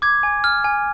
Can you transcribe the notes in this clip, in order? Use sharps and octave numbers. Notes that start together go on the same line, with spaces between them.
D6 G#6
G#5
F6
G#5